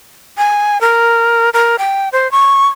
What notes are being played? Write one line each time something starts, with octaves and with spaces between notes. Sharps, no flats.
G#5
A#4
A#4
G5
C5
C#6